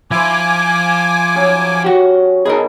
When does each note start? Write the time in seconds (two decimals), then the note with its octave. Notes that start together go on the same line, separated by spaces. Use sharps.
0.11 F3 E4 C5 G#5 D6
1.35 F#3 C#4 G#4
1.84 F#4 G4
2.45 B2 D#4 G#4 A#4 B5